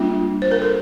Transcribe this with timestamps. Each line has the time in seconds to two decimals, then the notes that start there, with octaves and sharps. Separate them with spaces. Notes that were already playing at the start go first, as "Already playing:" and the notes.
Already playing: G3 A#3 D4 F4
0.42 C5
0.51 A#4
0.62 A4